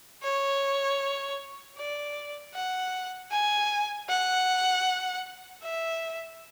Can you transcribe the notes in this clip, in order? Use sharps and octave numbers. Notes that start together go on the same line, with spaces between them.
C#5
D5
F#5
G#5
F#5
E5